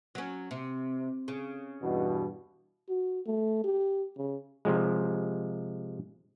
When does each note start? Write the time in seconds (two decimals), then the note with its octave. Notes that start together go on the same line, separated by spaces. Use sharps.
0.15 F#3 C#4
0.51 C3
1.28 C#3
1.82 E2 G2 B2
2.89 F#4
3.26 A3
3.64 G4
4.17 C#3
4.65 C3 F3 G#3